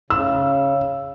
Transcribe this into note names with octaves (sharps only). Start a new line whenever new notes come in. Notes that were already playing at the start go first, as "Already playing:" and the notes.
C#3 E6